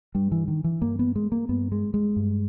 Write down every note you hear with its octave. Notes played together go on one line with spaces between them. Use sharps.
G2 G3
E3
D#3
E3
G2 A#3
B3
G#3
A#3
G2 B3
G#3
G#3
G2